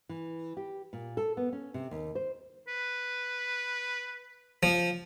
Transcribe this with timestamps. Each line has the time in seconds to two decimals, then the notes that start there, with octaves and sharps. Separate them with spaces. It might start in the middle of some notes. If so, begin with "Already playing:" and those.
0.09 E3
0.57 G4
0.93 A#2
1.17 A4
1.37 B3
1.53 C#4
1.74 C3
1.91 D#2
2.15 C5
2.68 B4
4.63 F3